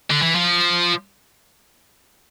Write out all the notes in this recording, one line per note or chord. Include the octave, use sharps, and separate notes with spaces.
D3
E3
F3